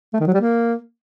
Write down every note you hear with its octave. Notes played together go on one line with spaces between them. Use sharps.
A3
D#3
F#3
G3
A#3